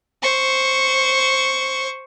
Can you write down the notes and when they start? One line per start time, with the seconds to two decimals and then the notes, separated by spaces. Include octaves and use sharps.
0.23 C5 C#6